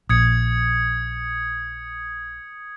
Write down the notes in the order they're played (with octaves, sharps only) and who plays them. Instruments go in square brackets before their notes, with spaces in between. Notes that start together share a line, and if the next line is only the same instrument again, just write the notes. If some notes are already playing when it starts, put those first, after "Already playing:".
[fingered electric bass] A#1 [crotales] D#6 G#6 C#7